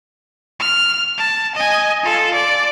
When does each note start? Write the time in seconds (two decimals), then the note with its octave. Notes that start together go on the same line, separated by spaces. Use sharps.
0.60 F6
1.18 A5
1.55 D#5 G#5
2.03 F4 A4
2.34 D5